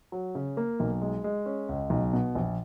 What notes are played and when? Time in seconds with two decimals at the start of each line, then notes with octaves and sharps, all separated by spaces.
0.12 F#3
0.35 C#3
0.57 A#3
0.80 B1
1.02 G#3
1.24 G#3
1.46 C#4
1.69 C#2
1.90 B1
2.13 B2
2.35 A#1